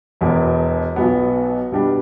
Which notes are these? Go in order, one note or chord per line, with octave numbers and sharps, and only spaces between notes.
E1 E2 B2 B3
B1 B2 B3
B2 G3 B3 D4 G4